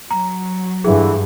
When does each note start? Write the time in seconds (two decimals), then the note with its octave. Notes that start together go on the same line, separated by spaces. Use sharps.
0.11 F#3 A#5
0.84 G2 D3 E3 G#4